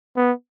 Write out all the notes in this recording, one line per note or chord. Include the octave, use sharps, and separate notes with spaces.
B3